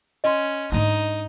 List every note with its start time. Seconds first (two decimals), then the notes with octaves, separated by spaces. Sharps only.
0.24 C#4 D#5 C6
0.72 G#2 D4 D#4